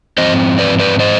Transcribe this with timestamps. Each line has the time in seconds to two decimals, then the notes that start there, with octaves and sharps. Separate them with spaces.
0.18 G#2 F3 C4 C5 D#5
0.59 B4 D5
0.80 B4 D5
1.00 C5 D#5